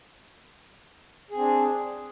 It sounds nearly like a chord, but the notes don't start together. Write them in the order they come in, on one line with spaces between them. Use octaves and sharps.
G#4 C4 D4